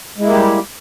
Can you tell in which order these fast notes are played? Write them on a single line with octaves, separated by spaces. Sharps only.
G#3 E4 A#3 G4 G3